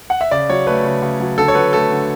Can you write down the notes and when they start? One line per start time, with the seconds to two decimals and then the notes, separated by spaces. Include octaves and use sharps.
0.10 F#5
0.21 E5
0.31 C#3 D5
0.49 F#3 C#5
0.67 A3 B4
0.84 C#3
1.02 C#3
1.20 F#3
1.38 D3 A4
1.48 C#5
1.55 F#3 B4
1.72 A3 A4
1.90 D3